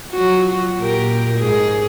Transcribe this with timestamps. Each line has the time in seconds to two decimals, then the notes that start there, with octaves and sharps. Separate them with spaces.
0.12 F#3 F4 F#4
0.78 A#2 G4 A#4
1.37 G#2 G#4